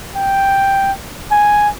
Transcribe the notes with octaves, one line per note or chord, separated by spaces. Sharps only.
G5
G#5